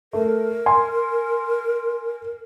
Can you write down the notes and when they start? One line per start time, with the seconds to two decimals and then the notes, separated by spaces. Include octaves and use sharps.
0.13 A3 A#4
0.66 G#5 C6